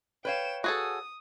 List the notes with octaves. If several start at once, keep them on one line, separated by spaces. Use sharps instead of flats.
B4 C#5 F5 G5 E7
F#4 G#4 A4 D#6